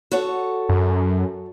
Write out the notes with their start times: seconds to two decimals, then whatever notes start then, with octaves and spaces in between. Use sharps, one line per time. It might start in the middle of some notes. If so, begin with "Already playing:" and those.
0.12 F#4 A4 C#5
0.69 F#2